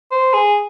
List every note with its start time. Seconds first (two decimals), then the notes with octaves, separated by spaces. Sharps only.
0.11 C5
0.33 G#4